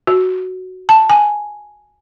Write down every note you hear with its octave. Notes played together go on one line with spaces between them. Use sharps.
F#4
A5
G#5